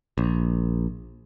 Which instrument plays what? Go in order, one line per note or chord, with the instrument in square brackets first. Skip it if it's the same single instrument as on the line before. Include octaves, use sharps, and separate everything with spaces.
[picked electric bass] A#1